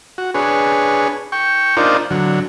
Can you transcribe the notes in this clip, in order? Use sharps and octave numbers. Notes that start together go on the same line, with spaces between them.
F#4
D4 G#4 B4 C#5
G5 C#6
D4 D#4 F4 A#4 C5 D5
D3 F#3